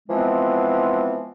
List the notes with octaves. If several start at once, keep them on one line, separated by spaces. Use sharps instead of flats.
E3 F3 G#3 B3 C4